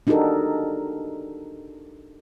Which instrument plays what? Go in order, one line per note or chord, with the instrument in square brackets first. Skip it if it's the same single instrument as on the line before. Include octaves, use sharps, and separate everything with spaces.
[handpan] D4 D#4 F#4 G4 A4 A#4